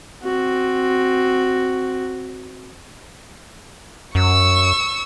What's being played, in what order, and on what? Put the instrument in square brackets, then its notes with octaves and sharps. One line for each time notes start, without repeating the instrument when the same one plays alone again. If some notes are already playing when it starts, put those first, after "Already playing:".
[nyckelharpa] C4 F#4
[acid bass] F#2 [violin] C#6 E6